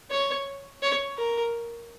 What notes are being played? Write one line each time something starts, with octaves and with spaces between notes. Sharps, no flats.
C#5
C#5
A#4